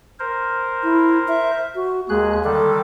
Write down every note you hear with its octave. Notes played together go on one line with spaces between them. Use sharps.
A#4 C5
E4
E5
F#4
D#2 G#3 G#4 F#6
D3 D#3 G3 A4